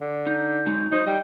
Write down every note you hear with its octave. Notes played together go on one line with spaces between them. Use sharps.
D3
D#4 G6
F#3 G#3 D#4
F#3 D#4 C5
G3 D#5 G5